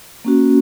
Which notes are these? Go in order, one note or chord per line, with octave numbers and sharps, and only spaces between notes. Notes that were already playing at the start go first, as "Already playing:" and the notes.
A#3 C#4 F#4